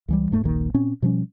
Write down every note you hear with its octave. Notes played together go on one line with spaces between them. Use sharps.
C#2 E3 G3
E1 G#2 A3
D#1 A#1 D#3 A#3
A#2 C4 C#4
B2 F3 G3 C#4